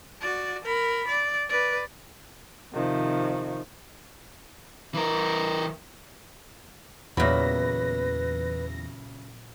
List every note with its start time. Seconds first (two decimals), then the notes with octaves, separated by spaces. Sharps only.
0.21 F#4 D5
0.65 A#4 B5
1.08 D5
1.49 B4 D5
2.73 C3 D#3 F3
4.94 E3 A#4
7.17 E2 A#2 C#3 F#3 B4 E5 B5 A#6